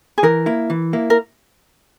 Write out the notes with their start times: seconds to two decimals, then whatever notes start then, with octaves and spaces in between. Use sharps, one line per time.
0.18 G#4
0.23 E3 A#4
0.46 A#3 E4
0.70 E3
0.93 A#3 E4
1.10 A#4